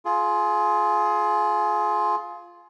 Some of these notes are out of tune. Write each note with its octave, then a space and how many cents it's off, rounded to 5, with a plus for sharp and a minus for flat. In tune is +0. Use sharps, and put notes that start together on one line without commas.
F4 +0 G#4 +25